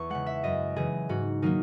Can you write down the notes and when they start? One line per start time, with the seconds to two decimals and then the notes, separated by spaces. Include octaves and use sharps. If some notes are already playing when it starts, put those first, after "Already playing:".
Already playing: E2 C#6
0.10 C#3 G#3 F#5
0.26 E5
0.44 F#2 D#5
0.76 C#3 E3 G#4
1.09 G#2 F#4
1.42 D#3 F#3 A#3 D#4